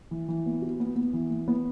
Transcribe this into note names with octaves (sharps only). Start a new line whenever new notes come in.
E3
E3
B3
F#4
B3
B3
E3
B3
B3